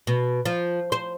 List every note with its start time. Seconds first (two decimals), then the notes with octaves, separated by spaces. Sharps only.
0.07 B2
0.45 F3
0.92 C5